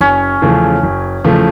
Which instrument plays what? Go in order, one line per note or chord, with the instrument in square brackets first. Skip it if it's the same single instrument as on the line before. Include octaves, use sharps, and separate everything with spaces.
[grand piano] F#1 [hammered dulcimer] C#4
[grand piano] E2 C#3 F3 A3
F#1
E2 C#3 F3 A3